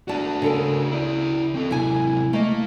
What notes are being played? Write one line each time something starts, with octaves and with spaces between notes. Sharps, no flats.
D4 F#4 D5 A5
C#3 A4 A#4
E4 D5
C4 A4
C3 F#3 E4 G#5
A3 A#3 D#5